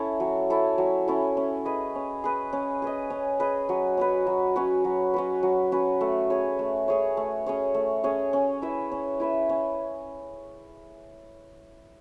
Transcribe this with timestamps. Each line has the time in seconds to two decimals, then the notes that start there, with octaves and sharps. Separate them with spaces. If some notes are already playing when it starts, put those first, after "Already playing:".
Already playing: C#4 E4 A4
0.20 F#3
0.50 C#4 E4 A4
0.78 F#3
1.08 C#4 E4 A4
1.37 C#4
1.65 G#4 B4 D#5
1.95 C#4
2.24 G#4 B4 D#5
2.53 C#4
2.82 G#4 B4 D#5
3.10 C#4
3.40 G#4 B4 D#5
3.69 F#3
3.97 C#4 F#4 B4
4.27 F#3
4.56 C#4 F#4 B4
4.84 F#3
5.14 C#4 F#4 B4
5.43 F#3
5.72 C#4 F#4 B4
6.01 A3
6.30 C#4 G#4 C#5
6.59 A3
6.88 C#4 G#4 C#5
7.17 A3
7.46 C#4 G#4 C#5
7.75 A3
8.04 C#4 G#4 C#5
8.33 C#4
8.62 E4 B4 E5
8.92 C#4
9.20 E4 B4 E5
9.49 C#4